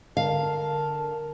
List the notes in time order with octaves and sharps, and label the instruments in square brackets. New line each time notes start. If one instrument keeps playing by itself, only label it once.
[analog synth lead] D3 [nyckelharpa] A#4 [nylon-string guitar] F5 [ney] A5